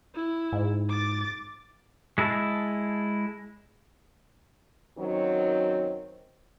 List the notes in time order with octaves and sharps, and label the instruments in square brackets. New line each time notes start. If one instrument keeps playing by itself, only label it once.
[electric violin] E4
[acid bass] G#2
[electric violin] D6 A6
[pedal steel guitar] G#3 E4 G#4 A5
[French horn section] F#2 D#3 F#3 C4